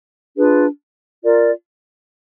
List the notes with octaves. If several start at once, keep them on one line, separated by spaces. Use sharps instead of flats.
D4 F4 G#4 B4
F4 A#4 D5